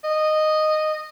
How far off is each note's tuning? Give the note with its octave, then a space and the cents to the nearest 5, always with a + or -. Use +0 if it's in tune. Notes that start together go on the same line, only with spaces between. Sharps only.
D#5 -10